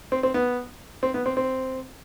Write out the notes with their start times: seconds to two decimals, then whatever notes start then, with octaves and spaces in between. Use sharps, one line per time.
0.12 C4
0.23 C4
0.34 B3
1.03 C4
1.14 B3
1.26 C4
1.37 C4